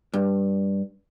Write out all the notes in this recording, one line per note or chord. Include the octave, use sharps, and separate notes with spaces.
G2